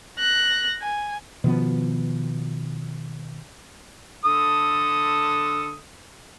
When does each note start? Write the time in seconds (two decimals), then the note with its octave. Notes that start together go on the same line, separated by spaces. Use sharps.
0.19 F#6 A#6
0.82 G#5
1.44 B2 D#3 F3 B3
4.25 D3 A4 D#6